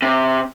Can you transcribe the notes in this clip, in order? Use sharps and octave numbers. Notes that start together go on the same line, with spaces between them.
C3